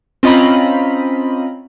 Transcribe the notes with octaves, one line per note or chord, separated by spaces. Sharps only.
C4 C#4 F4 D#5 A#5 B5